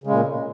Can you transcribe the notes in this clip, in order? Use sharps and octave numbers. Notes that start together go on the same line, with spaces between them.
A#2 C#3 G#3